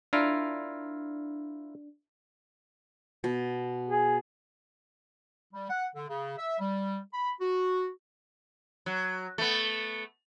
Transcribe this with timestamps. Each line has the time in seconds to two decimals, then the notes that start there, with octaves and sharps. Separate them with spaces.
0.13 D4 E4 F4 A#4
3.24 B2
3.89 G#4
5.54 G3
5.70 F#5
5.96 D3
6.09 C#3
6.38 E5
6.59 G3
7.14 B5
7.41 F#4
8.86 F#3
9.38 A3 B3